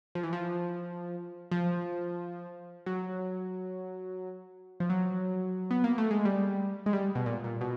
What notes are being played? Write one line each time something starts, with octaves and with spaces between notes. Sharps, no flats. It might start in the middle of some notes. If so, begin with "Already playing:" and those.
F3
E3
F3
F3
F#3
F3
F#3
B3
A#3
A3
G#3
G3
G#3
G3
B2
A#2
A#2
B2